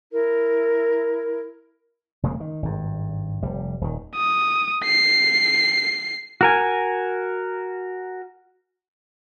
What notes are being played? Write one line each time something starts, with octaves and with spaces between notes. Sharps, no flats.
E4 A#4
F1 C#3 G#3 A#3
D#3
G#1 G2
F1 G3
D#1 D#3
D#6
C7
F#4 A#4 G#5